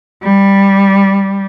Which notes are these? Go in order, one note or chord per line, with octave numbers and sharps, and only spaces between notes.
G3